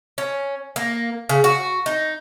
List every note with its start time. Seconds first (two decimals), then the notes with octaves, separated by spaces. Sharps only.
0.18 C#4
0.76 A#3
1.29 C#3
1.44 F#4
1.86 D#4